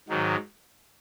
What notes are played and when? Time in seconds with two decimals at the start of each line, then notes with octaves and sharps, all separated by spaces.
0.09 G#2 D#3 F#3